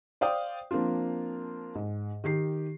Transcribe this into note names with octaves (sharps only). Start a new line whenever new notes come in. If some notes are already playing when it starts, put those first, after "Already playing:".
C5 D5 F5 G5 D#6
F3 A#3 C4 D4 F4
G#2
D#3 G4 C7